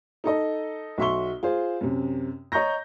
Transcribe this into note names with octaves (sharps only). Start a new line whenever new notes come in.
D#4 A4 D#5
B1 F#4 E5 C6 C#6 G7
F4 G#4 C5
F#2 C3
C#5 D#5 A#5 C#6 G6 A#6